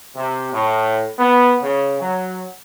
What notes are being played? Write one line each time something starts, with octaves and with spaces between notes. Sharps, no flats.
C3
A2
B3
C#3
F#3